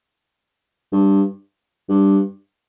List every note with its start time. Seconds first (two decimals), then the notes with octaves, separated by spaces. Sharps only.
0.92 G2
1.89 G2